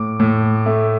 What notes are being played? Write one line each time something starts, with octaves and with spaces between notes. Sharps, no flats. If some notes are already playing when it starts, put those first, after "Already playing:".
Already playing: A2 D6
A2
A3